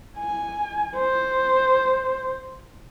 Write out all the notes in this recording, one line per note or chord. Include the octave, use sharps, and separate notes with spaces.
G#5
C5